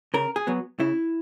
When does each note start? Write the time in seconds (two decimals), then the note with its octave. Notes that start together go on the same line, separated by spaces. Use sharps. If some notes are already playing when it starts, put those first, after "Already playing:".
0.14 C#3 A#4
0.36 G#4
0.47 F#3 B3
0.80 C#3 E4